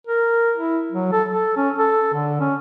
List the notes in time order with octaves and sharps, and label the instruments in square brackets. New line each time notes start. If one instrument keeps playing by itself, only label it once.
[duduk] A#4
E4
F#3
A4
A4
C#4
A4
D3
C#4